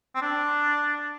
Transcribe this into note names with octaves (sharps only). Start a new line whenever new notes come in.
C4
D4